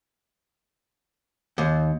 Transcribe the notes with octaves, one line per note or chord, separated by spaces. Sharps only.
D#2